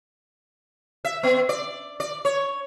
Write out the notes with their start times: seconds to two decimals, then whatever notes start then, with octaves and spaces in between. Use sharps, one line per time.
1.05 E5
1.23 B3
1.49 D5
2.00 D5
2.25 C#5